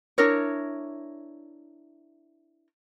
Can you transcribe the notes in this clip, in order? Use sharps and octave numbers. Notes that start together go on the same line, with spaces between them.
D4 E4 A#4 C#5